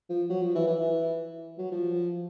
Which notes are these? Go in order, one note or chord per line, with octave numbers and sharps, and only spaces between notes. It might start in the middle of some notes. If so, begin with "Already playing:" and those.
F3
F#3
F3
E3
E3
F#3
F3